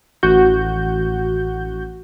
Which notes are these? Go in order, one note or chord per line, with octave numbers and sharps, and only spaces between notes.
A1 F#4 G6